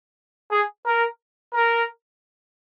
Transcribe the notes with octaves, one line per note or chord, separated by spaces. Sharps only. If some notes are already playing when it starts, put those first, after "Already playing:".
G#4
A#4
A#4